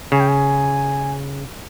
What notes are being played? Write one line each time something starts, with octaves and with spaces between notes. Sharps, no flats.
C#3 G#5
G5
G#5